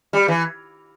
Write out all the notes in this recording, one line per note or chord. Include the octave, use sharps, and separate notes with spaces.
G3
E3